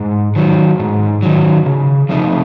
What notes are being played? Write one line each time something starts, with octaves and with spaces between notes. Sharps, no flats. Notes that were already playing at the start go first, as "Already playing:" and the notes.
Already playing: G#2
D#3 F#3
G#2
D#3 F#3
C#3
F3 A3 C4 D#4